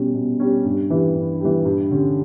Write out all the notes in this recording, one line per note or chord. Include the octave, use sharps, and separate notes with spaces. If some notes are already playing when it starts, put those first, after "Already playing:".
Already playing: B2 G3 C#4
B2
G3 C#4
G2
E3 G3
G2
E3 G3
G2
D3 G3 C#4